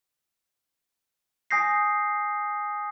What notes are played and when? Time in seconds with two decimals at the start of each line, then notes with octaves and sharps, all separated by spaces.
1.51 G#5 D#6 G6 A#6 C7